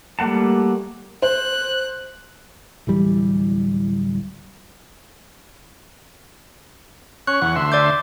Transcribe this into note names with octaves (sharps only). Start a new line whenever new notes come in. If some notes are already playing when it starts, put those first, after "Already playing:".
G3 A3 A#3 F#5 A5
C5 F#6
D1 E3 G3
C#4 C#5 F#6
E2 F#5 C#6
D2 E5 C6
D5 D6 G6